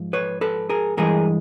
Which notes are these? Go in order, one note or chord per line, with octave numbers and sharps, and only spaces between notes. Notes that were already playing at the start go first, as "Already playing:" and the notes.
Already playing: G#2 F3
B4 C#5
A4 B4
G#4 A#4
G2 E3 G#3 G#4 A#4